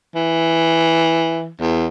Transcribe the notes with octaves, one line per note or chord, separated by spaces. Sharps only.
E3
E2